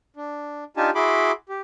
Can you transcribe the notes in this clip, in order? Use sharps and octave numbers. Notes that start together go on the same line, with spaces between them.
D4
D4 D#4 F4 G4 G#5 A5
E4 F#4 G#4 B5 C6 D6
G4